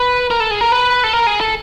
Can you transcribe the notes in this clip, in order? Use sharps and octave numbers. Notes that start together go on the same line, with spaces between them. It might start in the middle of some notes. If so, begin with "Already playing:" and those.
Already playing: B4
A#4
A4
G#4
A#4
B4
A4
A#4
G#4
A4